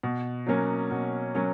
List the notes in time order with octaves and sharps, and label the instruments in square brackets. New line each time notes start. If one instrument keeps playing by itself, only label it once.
[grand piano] B2
F#3 A#3 C#4
B2
F#3 A#3 C#4